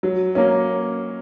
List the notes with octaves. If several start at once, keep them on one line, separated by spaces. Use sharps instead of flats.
F#3
A#3 C#4